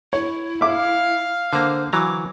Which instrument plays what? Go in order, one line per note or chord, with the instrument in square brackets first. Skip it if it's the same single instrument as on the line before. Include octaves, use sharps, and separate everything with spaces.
[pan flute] E4 [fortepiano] C#5
[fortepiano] E5 D6 [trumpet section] F5
[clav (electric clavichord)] D3 A#3 [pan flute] C5
[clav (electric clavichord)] E3 F#3 A#5 [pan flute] D6